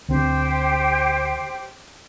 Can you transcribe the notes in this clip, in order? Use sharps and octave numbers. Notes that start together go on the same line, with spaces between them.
D2 C4 G4 C5 G5